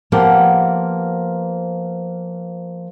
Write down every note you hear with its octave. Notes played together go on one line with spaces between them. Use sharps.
F3 A#3 B3 G4 F#5